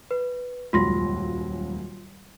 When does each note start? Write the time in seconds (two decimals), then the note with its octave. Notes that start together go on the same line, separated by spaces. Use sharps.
0.11 B4
0.73 D#1 C#2 F#2 F4 C6 A#6